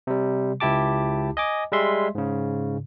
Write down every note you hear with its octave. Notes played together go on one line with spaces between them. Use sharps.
C3 G3
C#2 E4 G4 A5 D6
D#5 G#5 D6
G3 G#3 E5 C6
G#2 C#3